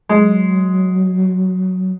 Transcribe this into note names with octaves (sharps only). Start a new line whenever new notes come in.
F#3 G#3